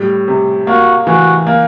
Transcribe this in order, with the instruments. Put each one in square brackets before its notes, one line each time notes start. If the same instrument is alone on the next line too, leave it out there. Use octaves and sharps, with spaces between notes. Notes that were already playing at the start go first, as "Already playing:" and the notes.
Already playing: [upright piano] A2 G3
C3
[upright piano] A#3 [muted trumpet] F#4
[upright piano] E3 [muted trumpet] F#4
[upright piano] A#3